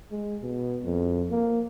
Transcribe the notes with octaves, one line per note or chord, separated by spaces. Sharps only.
G#3
B2
F2
A#3